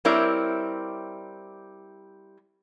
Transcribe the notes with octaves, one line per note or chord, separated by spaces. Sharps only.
G3 C4 E4 A#4 C#5 D5